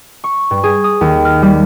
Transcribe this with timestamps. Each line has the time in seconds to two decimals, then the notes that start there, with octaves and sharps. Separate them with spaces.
0.24 C#6
0.51 G2
0.63 G#4
0.84 D#6
1.01 D#2
1.25 F6
1.42 G3